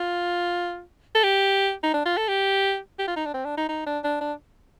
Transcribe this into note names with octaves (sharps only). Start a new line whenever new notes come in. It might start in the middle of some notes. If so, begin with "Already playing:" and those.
Already playing: F4
A4
G4
D#4
D4
F4
A4
G4
G4
F4
D#4
D4
C4
D4
D#4
D#4
D4
D4
D4